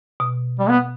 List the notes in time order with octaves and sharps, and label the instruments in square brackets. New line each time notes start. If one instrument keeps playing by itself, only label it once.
[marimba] B2
[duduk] G3
B3